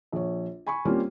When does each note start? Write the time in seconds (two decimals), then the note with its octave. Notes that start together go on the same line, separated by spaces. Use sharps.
0.12 A#1 C#5
0.67 G#5 B5 C#6
0.85 G3 A#3 C4 C#4 F4 G4